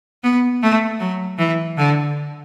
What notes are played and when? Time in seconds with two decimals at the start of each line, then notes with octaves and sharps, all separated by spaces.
0.23 B3
0.62 A3
1.00 F#3
1.38 E3
1.77 D3